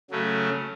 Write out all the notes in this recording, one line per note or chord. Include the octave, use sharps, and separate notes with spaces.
C#3 F#3 A3 C#4